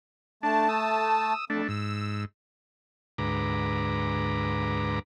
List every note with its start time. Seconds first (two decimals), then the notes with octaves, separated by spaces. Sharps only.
0.43 A3 D4 A5
0.69 D#6 E6
1.50 F2 A3 D4
1.68 G#2 E6
3.18 D2 G#2 B4 A#5 D6